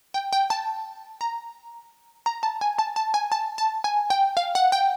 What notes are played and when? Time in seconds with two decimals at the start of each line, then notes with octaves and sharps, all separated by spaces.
0.14 G5
0.33 G5
0.50 A5
1.21 A#5
2.26 A#5
2.43 A5
2.61 G#5
2.79 A5
2.96 A5
3.14 G#5
3.32 A5
3.58 A5
3.84 G#5
4.10 G5
4.37 F5
4.55 F#5
4.72 G5